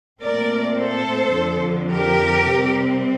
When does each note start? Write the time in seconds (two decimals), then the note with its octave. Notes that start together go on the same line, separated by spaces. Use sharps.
0.21 A#2 A3 C4 A#4 D5
0.78 A4 C5
1.34 F2 D3 F3
1.91 G4 A#4
2.48 C3 G3 C4